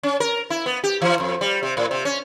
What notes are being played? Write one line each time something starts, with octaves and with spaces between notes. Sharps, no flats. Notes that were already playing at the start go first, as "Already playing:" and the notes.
C#4
A#4
E4
B3
G4
E3
F2
G3
C3
A2
C3
C#4